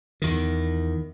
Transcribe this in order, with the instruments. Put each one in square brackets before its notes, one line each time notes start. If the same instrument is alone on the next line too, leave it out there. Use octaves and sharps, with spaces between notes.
[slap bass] E2 D#3